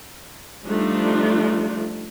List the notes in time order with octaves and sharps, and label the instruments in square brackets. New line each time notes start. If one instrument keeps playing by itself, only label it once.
[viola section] F3 G3 A3 D4 D#4 F4